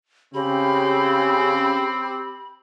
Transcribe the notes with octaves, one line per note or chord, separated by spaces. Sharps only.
C#3 C4 G4 B5